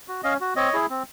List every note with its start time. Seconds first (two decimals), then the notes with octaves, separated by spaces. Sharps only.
0.08 F#4
0.23 C#4 D#5 F5
0.41 F#4
0.56 C4 C#5 D#5
0.73 E4 G#4
0.90 C4